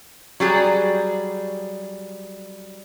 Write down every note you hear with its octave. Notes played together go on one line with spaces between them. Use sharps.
F#3 G3 G#4